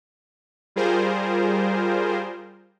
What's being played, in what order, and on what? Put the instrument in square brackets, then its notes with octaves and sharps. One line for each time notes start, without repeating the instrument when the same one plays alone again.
[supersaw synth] G3 F4 G#4 A#4 C5